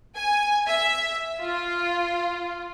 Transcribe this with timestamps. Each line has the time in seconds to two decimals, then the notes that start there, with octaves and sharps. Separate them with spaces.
0.15 G#5
0.67 E5
1.41 F4